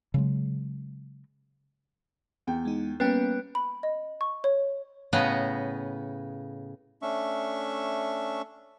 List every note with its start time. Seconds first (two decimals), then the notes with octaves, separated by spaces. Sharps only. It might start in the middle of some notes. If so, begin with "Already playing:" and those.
0.14 C#3 F#3 G#3
2.47 E2 G5
2.65 G#3 D#4
3.00 G3 A#3 B3 C#4 B4 G5 A6
3.55 B5
3.83 D#5
4.21 C#6
4.44 C#5
5.13 A2 C#3 B3 D#5 A#5
7.02 A3 C#4 D4 E5 C#6